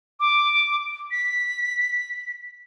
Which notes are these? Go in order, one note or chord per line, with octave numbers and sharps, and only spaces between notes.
D6
B6